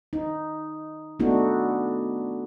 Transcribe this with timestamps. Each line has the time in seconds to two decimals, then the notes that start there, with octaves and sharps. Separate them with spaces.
0.13 D#4
1.20 A3 B3 D4 D#4 F#4